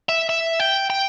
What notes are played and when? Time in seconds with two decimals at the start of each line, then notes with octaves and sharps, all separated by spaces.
0.09 E5
0.29 E5
0.60 G5
0.90 G5